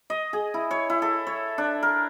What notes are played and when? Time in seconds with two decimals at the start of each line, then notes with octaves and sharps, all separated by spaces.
0.10 D#5
0.33 G#4
0.54 E4
0.71 C#5
0.90 E4
1.02 A4
1.27 C#5
1.58 D4
1.83 A#4